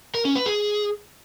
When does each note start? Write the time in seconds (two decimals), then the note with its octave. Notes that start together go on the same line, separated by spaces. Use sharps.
0.15 A#4
0.25 C#4
0.35 B4
0.46 G#4